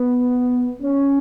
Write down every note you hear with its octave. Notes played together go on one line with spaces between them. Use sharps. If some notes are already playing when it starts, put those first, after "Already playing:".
Already playing: B3
C#4